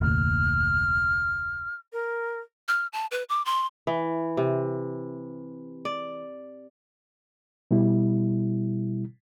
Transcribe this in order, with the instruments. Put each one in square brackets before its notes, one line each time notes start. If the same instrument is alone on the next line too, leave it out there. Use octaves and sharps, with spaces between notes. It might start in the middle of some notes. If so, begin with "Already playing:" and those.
[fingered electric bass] F1 D2 A#2 [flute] F6
[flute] A#4
[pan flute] F6
A5
B4
D6
C6
[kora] E3
C3
D5
[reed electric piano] B2 G3 E4